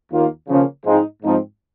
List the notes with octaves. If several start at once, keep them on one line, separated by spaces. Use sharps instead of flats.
D#2 D#3 A#3 F4
C#3 F3 A#3 C#4
G#2 F3 G#3 C4 D#4
G#2 F3 C4 D#4